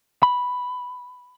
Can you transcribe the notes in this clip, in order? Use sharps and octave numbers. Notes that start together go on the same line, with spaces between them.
B5